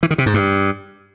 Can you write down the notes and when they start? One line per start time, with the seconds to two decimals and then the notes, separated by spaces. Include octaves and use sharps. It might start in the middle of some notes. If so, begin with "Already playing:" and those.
0.03 E3
0.11 D#3
0.18 C3
0.26 G#2
0.34 G2